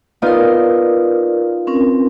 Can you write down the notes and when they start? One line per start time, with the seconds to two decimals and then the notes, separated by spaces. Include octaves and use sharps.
0.22 B3 D#4 F4 A#4 D5
1.67 C4 C#4 A#4